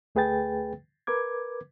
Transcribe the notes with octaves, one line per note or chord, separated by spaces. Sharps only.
D2 A3 G#4 B4 G5 A6
A#4 B4 D6 G#6